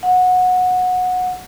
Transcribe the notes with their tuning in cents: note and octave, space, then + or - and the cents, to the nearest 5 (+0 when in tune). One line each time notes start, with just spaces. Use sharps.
F#5 -20